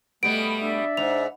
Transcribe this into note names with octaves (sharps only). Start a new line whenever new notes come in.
B2 G3 A3 B3 D7
D4 D5 E5
G#2 C5 F7